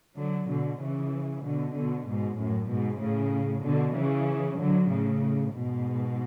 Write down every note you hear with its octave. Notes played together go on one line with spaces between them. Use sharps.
D3 F#3
B2 D3
C#3 E3
B2 D3
B2 D3
G#2 B2
F#2 A2
G#2 B2
A2 C#3
B2 D3
C#3 E3
D3 F#3
A2 C#3
G#2 B2